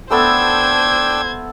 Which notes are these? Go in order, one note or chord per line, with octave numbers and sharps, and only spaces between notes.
A3 B3 D4 A4 C5 G5 E6 G#6